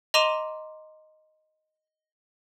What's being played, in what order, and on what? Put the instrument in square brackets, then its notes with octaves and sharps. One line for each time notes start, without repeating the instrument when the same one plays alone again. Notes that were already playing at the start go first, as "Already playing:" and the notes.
[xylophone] D#5 A#5 C6 D6 D#7 E7